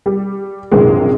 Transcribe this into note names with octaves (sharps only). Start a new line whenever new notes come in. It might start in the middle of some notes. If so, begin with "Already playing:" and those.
G3
A#1 F#2 C3 D#3 G#3